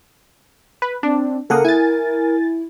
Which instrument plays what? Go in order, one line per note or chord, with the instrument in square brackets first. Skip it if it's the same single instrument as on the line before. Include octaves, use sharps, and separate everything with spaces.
[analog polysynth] B4
[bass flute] C4 [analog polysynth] D4
[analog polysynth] C#3 A#3 [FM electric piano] A4 F#5 D#6 [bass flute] A#4
[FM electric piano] E4 [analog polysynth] G#5 A6